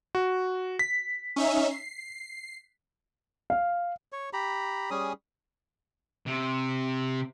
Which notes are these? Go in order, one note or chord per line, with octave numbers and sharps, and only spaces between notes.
F#4
B6
C#4 D#4 E5
C7
F5
C#5
G4 A#5 B5
G3 C#4 G#4 D#6
C3